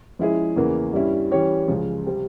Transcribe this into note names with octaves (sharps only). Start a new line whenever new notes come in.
F3 G#3 C#4 E4 G#4
E2 C#3 E3 A#3
G2 G3 C#4 E4
E3 G3 C#4 G4 C#5
C#2 C#3 F3
C3 G3 C4